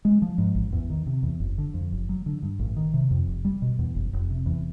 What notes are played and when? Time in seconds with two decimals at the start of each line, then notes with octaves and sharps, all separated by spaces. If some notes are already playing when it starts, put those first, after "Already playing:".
0.05 G#3
0.22 F3
0.38 G#2
0.55 A1
0.73 E2
0.90 D#3
1.07 C3
1.23 E2
1.40 F#1
1.58 D3
1.74 F2
1.92 F#1
2.09 F#3
2.26 D3
2.43 G2
2.59 A1
2.77 D#3
2.94 C3
3.11 F2
3.27 F1
3.45 G3
3.62 B2
3.79 E2
3.95 F#1
4.13 F1
4.30 C3
4.46 E2